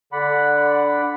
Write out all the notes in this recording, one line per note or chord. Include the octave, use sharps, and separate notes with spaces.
D3 D5 F#5 B5